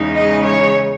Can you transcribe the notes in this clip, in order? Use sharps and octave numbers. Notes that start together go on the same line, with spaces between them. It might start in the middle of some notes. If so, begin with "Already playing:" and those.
Already playing: E2 C#3 G#3 D#4
D#5
C#5